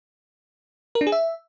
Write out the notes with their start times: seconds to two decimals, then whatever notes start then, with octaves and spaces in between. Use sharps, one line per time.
0.95 A#4
1.01 D4
1.07 G#4
1.12 E5